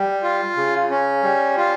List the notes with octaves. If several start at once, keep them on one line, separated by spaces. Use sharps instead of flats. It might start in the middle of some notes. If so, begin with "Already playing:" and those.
Already playing: G3
F4
C#3
C#4
G3
F4